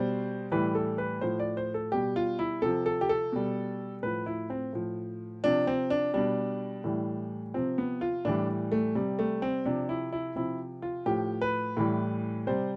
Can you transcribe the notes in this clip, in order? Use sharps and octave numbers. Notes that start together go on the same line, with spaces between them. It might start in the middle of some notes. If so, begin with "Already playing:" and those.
Already playing: B2 G3 C5
A2 E3 G3 B4
A4
B4
A2 F3 C5
D5
C5
A4
B2 G3 G4
F4
E4
C3 F3 A4
A4
G4
A4
B2 G3
A2 F3 B4
E4
C4
A2 F3
C3 F3 D4
C4
D4
B2 G3 D4
A2 E3 G3
C3 F3 C4
B3
F4
A2 E3 G3 D4
A3
C3 G3
A3
C4
C3 F3 D4
E4
E4
C3 F3 E4
F4
A2 F3 G4
B4
A2 E3 G3
C3 G3 C5